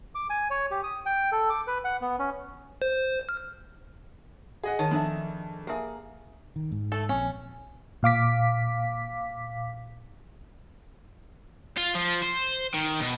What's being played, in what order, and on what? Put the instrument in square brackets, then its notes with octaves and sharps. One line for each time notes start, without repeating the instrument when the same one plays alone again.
[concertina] D6
G#5
C#5
G4
D#6
G5
A4
D6
B4
F#5
B3
C#4
[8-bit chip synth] C5
F6
[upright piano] G#4 D#5 F#5
[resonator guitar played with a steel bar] D#3 [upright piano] C#5 [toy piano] A5
[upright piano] F2 [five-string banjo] D4 G#4 E5
[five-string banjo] A#3 G#4 [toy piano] G4 E5
[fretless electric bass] D#3
G#2
[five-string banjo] A3 A4
[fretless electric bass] A#1 C4 [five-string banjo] C#4
[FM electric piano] A#2 F5 D6 B6
[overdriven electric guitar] F4
F3
C5
D#3
B2